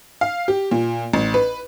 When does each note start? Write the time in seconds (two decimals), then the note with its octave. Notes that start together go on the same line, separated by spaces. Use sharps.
0.21 F5
0.48 G4
0.71 A#2
1.14 A1
1.34 B4